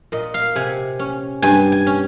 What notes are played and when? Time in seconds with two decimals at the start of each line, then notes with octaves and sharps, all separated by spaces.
0.12 A#2 D#5
0.34 F5
0.56 C3 G#5
0.99 C#4
1.42 G2 G#5
1.72 G#5
1.87 C#4